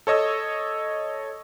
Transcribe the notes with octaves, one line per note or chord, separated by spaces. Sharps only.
A4 C#5 D#5 E6